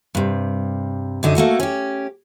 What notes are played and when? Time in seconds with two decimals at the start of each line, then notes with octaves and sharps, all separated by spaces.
0.15 G2 C3
1.23 F#2 D3 D#4
1.35 A3 A#3 F#4 A4
1.60 C#4 G4